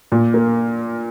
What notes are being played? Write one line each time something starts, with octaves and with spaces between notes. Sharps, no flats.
A#2
A#3